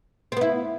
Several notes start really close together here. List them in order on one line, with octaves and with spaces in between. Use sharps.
C4 B3 E4